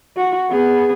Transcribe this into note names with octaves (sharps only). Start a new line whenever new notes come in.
F#4
B3 G#4